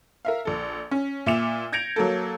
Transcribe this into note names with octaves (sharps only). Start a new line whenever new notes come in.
A#4 E5 F5
A#1 A4
C#4
A#2 E5 D6 C#7 E7 F7
G6 G#6 A#6 C#7 D7 F7
F#3 A#3 A4